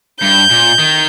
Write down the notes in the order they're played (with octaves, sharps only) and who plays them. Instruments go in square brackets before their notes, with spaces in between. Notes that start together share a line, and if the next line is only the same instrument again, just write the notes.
[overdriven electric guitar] G2 [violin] G6
[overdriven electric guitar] A#2
D#3